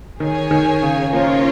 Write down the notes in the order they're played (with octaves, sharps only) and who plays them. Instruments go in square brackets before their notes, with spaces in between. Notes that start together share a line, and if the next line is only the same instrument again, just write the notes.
[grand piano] D#3 [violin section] G#4 C#5 G#5
[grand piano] D#3
C#3
[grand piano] F3 A#3 [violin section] C#4 F4 A#4 C#5